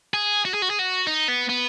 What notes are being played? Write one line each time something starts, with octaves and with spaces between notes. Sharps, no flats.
G#4
F#4
G#4
F#4
G#4
F#4
D#4
B3
B3